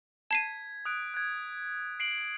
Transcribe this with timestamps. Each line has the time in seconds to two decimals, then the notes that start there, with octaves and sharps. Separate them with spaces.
0.31 A5 G#6 B6 C7 D#7
0.85 D#6 F#6 D7
1.14 F#6 G#6
2.00 C7 D7 F#7